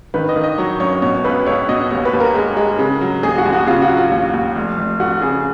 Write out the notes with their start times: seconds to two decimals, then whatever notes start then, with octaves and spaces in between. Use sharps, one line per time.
0.14 D#3 B4
0.29 D#5
0.36 D#3
0.43 D#5
0.58 F#3 C#5
0.80 F#2 C#5
1.02 B2 C#5
1.24 C#2 B4
1.46 C#2 C#5
1.69 B2 D#5
1.91 D#2 C#5
2.05 B4
2.13 D#2
2.20 A#4
2.35 G#3
2.57 G#3
2.79 C#3
3.01 F#3
3.23 D#2 G#4
3.38 F#4
3.45 D#2
3.53 F#4
3.67 C#3 F4
3.82 F#4
3.89 F#3
3.97 F4
4.11 D#2
4.34 D#2
4.56 F1
4.78 F1
5.00 F1 F#4
5.22 C#3 G#4